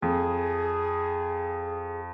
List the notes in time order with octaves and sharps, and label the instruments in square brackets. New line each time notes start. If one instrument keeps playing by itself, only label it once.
[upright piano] F2 [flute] G#4